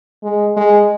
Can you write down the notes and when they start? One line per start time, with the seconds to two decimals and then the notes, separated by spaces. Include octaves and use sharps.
0.23 G#3
0.56 G#3